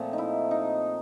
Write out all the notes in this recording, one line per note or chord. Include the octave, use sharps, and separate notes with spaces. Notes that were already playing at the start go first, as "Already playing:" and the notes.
Already playing: A#2 F3 A3 C4
D#4
E4
D#4